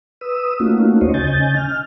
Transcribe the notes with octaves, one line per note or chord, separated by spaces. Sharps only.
B4 D#6 E6
A3 A#3 C#4 D#4 F4 F#4
D#2 C5 C#5 D#5
C#3 C#4 D#5 G#5 G6 A6
F6